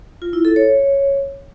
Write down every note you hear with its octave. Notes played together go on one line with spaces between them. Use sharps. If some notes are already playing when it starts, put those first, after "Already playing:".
F4
E4
A4
C#5